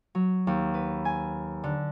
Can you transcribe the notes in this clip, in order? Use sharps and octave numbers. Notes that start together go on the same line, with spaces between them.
F#3
D#2
B4
G#5
D3